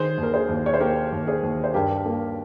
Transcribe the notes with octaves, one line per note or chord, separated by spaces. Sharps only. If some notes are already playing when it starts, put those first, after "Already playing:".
Already playing: D#3 G#4 C5
D#2 A#4
G#4 C5
D#2
C#5
C5
A#3 G4 A#4
D#2
G#4 C5
D#2
C5
G2 G4 A#4
A#3